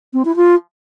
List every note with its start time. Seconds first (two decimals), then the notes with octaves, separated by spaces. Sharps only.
0.13 C4
0.25 E4
0.36 F4